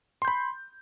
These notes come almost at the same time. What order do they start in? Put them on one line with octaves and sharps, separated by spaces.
C6 G6 B5